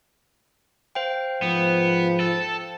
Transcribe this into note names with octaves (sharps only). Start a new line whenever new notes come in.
C5 F5 G5
G#2 F3 B3
A4